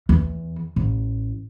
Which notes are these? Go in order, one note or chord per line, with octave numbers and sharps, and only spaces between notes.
E2
A1